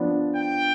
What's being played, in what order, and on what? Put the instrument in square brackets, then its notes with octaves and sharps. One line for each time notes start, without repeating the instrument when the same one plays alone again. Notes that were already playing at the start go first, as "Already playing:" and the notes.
Already playing: [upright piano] F3 B3 D4
[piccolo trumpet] G5